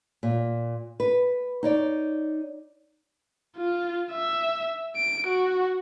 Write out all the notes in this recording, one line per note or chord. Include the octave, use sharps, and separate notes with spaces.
A#2
B4
D#4 C#5 D5
F4
E5
D7
F#4